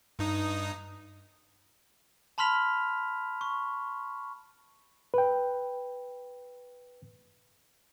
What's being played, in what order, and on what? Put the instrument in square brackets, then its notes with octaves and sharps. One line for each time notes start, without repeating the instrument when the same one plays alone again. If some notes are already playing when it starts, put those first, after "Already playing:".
[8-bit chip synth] G2 D#4 D#6
[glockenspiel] A5 B5 C6 F6 B6 F7
C#6
[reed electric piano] B4 G5